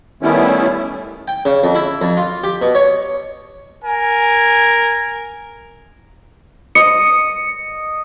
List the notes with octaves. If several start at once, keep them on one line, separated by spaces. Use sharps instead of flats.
D#3 G3 A3 B3 C#4 E4
G5
C#3
F2
E4
F2
F4
G4
B2
C#5
A#4 G#5
D#5 C#7